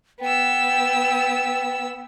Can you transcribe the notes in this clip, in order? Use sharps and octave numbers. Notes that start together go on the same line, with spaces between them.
B3 G5 E6